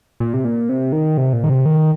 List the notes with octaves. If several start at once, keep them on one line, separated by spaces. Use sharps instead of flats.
A#2
C3
A#2
C3
D#3
C3
A#2
D#3
C3
D#3